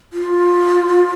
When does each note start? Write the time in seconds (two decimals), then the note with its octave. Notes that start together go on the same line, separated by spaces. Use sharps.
0.13 F4